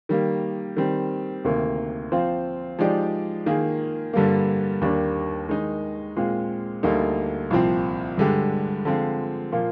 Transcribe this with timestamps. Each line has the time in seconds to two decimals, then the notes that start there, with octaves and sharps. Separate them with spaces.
0.09 D#3 G3 A#3
0.76 D#3 G3 C4
1.44 D2 C3 D#3 A#3
2.12 F3 C4 F4 C5
2.79 F3 G#3 D#4 G4 D5
3.46 D#3 A#3 F4 G#4
4.13 G2 D3 G3 A#3
4.81 D#2 D#3 G3 A#3 D4
5.49 D#3 G#3 D#4
6.16 A#2 G#3 C4 F4
6.83 D2 D3 G3 A#3 D#4
7.51 C2 A#2 F3 C4
8.18 G2 D3 G#3 D4 G4
8.85 D3 F3 G#3 C4 F4
9.52 A#2 F3 A#3 F4